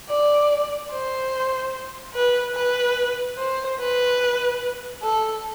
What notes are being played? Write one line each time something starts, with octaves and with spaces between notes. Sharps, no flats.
D5
C5
B4
B4
C5
B4
A4